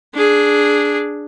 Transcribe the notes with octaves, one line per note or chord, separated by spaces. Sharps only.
D4 G#4